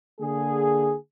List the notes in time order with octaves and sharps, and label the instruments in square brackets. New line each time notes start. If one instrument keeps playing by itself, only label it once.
[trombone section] D3 A#3 G#4